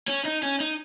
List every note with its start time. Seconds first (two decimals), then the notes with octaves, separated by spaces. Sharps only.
0.08 C#4
0.25 D#4
0.43 C#4
0.60 D#4